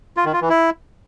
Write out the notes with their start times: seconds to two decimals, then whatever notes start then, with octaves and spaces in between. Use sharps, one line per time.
0.17 F4
0.25 D#3
0.33 F4
0.41 E3
0.50 E4